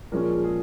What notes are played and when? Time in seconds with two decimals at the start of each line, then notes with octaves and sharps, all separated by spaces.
0.12 A#2 F3 G#3 C#4 A#4
0.44 G#4